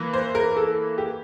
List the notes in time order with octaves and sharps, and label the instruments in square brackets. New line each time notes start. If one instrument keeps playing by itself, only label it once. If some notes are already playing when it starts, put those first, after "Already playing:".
Already playing: [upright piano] E3 A#3
C5
A#4
A4
G4